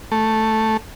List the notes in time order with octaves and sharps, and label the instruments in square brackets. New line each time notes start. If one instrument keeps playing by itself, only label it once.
[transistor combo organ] A3